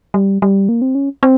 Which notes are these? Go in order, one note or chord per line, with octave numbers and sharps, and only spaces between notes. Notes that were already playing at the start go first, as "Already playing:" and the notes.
G3
G3
A#3
C4
C#4
C4